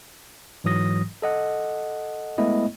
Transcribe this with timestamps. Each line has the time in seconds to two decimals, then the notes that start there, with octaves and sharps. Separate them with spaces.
0.64 G#2 E3 F#3 D#6 A#6
1.22 A4 D#5 F#5
2.38 G#3 A3 B3 E4 D#5